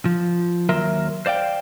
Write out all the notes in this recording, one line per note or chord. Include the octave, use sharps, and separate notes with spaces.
F3
D#2 F#3 A#4 E5 A#5 C6
C5 D5 F5 G5